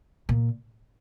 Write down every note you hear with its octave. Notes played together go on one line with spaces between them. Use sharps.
A#2